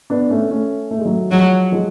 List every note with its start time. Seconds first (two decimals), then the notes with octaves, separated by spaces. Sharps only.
0.10 B3 D4
0.30 A3 C#4
0.50 A3 C#4
0.91 A3
0.99 G#3
1.05 F#3 A3
1.31 F3 F#3 G#3
1.72 F3 G#3